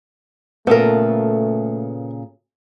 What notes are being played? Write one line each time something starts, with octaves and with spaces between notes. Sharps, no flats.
A#2 C#3 A3 B3 A4 A#4